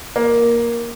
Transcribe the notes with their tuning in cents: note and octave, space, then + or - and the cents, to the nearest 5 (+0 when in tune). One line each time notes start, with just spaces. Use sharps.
A#3 +10